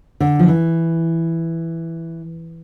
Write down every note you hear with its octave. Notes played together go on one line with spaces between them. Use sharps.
D3
F3
E3